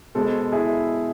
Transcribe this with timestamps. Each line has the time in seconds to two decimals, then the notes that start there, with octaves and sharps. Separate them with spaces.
0.15 B2 G#3 A4 C5
0.52 E4 G#4